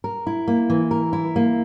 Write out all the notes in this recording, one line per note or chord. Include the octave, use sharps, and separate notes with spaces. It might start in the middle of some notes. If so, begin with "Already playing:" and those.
A#4
E4
A#3
E3
A#4
E4
A#3